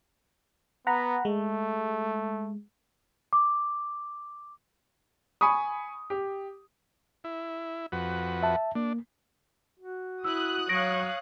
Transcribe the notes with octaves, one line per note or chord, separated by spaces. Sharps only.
B3 F#5 A#5 B5
G#3 A3
D6
G#5 B5 C#6 D#6
G4
E4
F2 F#4 B4
E5 A5
A#3 D4
F#4
E4 D#6 E6 F#6
F#3 C#5 F5 A#6 D7